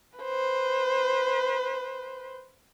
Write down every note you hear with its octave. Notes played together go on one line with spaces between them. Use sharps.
B4 C5